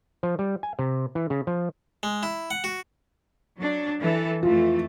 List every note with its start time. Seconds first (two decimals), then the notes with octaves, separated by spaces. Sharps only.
0.23 F3
0.39 G3
0.63 G#5
0.79 C3
1.15 E3
1.30 C#3
1.47 F3
2.03 G#3
2.23 E4
2.51 F#5
2.64 F#4
3.57 F#3 D4
3.99 E3 A4
4.43 F2 E3 A3 F4